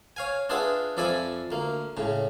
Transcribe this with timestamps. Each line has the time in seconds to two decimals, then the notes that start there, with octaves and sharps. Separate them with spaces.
0.16 C#5 F5 G#5
0.49 D4 F4 G#4 B4 E5 F#5
0.97 F2 F3 D5 E5 G#5 B5
1.51 D2 A#3
1.97 A2 C#3